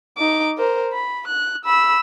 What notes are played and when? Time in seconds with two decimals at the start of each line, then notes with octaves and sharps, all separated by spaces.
0.18 D#4 D6
0.57 A#4 C5
0.93 B5
1.28 F#6
1.65 B5 E6